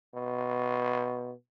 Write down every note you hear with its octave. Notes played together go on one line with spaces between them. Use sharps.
B2